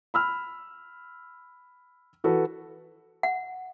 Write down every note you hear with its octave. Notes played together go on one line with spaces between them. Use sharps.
B5 E6 F6
E3 F#4 A4 B4
F#5